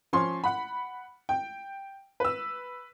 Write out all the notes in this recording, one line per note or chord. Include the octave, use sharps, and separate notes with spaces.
F3 C#4 C6
F#5 B5
G5
B4 E6